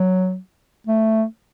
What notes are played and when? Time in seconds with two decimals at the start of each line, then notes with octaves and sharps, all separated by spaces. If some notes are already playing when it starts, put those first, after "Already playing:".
Already playing: F#3
0.87 A3